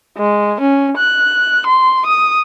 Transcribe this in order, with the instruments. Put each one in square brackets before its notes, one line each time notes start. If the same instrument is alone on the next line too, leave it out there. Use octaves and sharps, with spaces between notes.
[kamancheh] G#3
C#4
F#6
C6
D#6